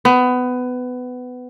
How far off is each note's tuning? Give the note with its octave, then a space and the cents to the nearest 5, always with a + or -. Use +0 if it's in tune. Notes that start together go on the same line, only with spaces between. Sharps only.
B3 +20